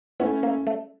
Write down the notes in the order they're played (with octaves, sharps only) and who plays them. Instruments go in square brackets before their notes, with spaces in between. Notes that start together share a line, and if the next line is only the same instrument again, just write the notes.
[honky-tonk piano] A3 C#4 E4 [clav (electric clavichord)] B3
[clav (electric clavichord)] A#3
A3